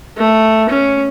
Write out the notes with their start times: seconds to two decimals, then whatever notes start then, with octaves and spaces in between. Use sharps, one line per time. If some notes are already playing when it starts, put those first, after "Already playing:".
0.17 A3
0.69 C#4